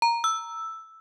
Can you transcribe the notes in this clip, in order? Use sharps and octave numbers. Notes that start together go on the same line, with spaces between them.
A#5
E6